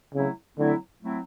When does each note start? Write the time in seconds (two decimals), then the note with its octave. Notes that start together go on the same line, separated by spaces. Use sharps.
0.14 C#3 F#3 A3 C4 E4
0.58 D3 F#3 A3 C4 E4
1.02 F#3 A3 C4 E4